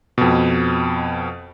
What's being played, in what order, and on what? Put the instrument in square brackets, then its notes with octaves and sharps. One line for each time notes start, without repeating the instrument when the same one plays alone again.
[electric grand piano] F2 B2